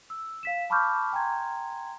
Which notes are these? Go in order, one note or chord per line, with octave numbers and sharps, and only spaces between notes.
E6
F5 B6 E7
A5 B5 C#6 D6 F6 G6
G5 G#5 A#5 C6 G#6